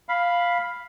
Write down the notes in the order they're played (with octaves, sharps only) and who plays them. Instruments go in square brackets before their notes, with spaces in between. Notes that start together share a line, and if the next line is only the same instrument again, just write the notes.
[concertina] F5 B5